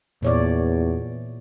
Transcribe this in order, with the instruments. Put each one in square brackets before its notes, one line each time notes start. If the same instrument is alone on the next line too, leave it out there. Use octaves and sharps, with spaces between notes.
[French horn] E2 [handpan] A#2 C#5 D5